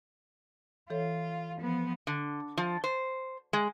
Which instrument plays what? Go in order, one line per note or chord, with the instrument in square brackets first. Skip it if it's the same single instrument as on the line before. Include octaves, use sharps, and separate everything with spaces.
[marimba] E3 A4 C#5 [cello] F4
[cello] F3 B3
[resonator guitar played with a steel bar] D3
F3
C5
G#3